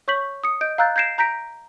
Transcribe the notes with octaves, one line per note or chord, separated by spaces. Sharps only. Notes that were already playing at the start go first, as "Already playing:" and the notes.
C#5 C#6 G6 B6 F#7
D#6 C#7
D#5 G6 D7
F5 A#5 E6 F#6 G6 A6
G6 G#6 A#6 C7 D7 E7
A#5 G6 A#6 B6 D7